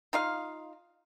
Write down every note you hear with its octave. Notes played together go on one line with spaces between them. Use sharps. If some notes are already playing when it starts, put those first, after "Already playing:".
D#4 F4 F5